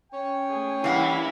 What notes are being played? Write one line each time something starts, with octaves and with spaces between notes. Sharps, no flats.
C#4 C#5 G5
A3 G#4
G2 E3 A#3 E4 F5 F#5 B5